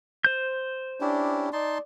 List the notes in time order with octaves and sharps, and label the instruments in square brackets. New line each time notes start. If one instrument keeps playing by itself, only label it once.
[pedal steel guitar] C5 G6
[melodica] C#4 E4 G4 [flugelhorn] D4
[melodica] D#4 A5 C6 [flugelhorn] D5